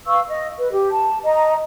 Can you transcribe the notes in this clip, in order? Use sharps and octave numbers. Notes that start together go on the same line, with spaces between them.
B4 F5 C#6 E6
D#5
B4
G4
A5
D#5 A#5